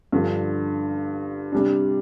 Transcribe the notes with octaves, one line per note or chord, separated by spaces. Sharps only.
G2 D3 F3
C3 G3 D4